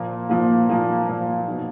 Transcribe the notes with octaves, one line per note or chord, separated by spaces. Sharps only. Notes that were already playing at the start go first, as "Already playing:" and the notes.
Already playing: A#2 F3 A#3
A#2 F3 A#3
A#2 F3 A#3
A#2 F3 A#3
B2 A#3 D#4 F#4